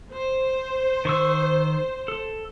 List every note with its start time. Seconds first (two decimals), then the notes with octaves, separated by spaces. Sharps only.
0.11 C5
1.05 D#3 C#6 E6
2.08 A4